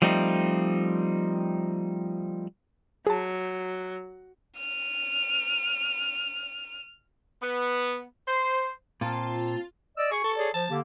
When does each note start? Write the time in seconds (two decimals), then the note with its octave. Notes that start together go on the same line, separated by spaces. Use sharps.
0.02 F3 G3 A3 C4 D#4
3.07 F#3 G#4 A5
4.57 F6 D#7
7.43 B3
8.28 C5
9.01 A#2 C4 F4 A5
9.97 D5 D#5 E6
10.12 G#4 C#6
10.24 A4
10.37 G#4 C#5 D5
10.54 F3 A5
10.69 D3 A#3 G4